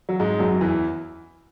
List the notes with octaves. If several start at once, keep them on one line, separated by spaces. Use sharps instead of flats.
F#3
G#2 G#3
F#2 F#3
E2 E3